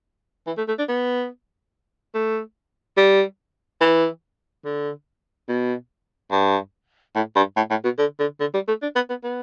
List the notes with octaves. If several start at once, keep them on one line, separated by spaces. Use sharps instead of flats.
E3
A3
A3
D4
B3
A3
G3
E3
D3
B2
G2
A2
G2
A2
A2
B2
D3
D3
D3
G3
A3
D4
B3
B3
B3